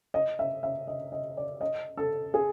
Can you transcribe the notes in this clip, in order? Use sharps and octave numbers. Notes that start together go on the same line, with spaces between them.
D#5
E5
E5
D#5
D#5
D5
D#5
A4
G#4